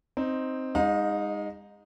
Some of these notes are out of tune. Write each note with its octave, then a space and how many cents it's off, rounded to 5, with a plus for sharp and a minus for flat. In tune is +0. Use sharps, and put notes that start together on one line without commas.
C4 +0 D#4 +0
G#3 -35 D#4 +0 F5 +45